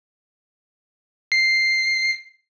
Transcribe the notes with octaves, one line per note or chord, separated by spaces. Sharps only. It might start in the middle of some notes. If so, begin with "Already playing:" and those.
C7